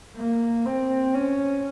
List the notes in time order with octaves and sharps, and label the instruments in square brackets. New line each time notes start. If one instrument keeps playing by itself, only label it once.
[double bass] A#3
C4
C#4